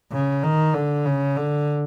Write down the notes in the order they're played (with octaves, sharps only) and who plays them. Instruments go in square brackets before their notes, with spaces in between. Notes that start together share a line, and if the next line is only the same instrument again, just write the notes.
[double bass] C#3
D#3
D3
C#3
D3